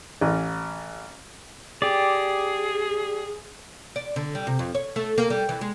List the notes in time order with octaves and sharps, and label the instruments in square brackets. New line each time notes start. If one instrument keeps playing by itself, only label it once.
[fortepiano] A1
[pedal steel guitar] G4 D5 [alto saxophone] G#4
[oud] D5
D3
G3
C3
F2
C#5
A3
A#3
G3
E3
G#3